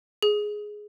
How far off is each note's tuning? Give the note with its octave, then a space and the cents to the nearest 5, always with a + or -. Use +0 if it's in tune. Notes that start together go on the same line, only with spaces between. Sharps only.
G#4 +5